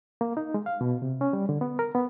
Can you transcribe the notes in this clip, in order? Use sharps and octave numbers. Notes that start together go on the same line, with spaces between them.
A#3
D#4
G#3
F5
B2
C3
C#4
G3
D3
B3
A#4
B3